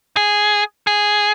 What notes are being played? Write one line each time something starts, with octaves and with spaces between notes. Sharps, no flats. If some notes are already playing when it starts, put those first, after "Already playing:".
G#4
G#4